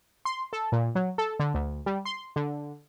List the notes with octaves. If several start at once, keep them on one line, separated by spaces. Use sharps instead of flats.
C6
A4
A#2
F#3
A4
D3
D2
G3
C6
D3